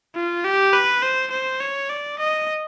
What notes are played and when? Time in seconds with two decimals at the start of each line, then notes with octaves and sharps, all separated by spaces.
0.15 F4
0.44 G4
0.73 B4
1.02 C5
1.31 C5
1.60 C#5
1.89 D5
2.19 D#5